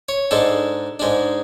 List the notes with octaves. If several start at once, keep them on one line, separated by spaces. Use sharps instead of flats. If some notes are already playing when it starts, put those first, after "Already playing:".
C#5
G#2 G#3 D4 A4
G#2 G#3 D4